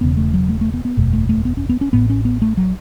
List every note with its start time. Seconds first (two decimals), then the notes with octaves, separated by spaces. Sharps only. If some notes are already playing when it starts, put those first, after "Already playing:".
0.01 E1 E2 C#3 B3
0.17 A3
0.34 F#3
0.49 A3
0.61 A3
0.74 B3
0.85 B3
0.97 F#1 E2 B2 A3
1.13 A3
1.29 A3
1.45 B3
1.57 C#4
1.69 B3
1.81 C#4
1.93 A1 A2 B3
2.10 C#4
2.25 B3
2.42 A3
2.57 F#3